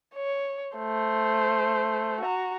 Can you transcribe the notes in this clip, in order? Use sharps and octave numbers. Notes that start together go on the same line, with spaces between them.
C#5
A3 C5
F#4 A#5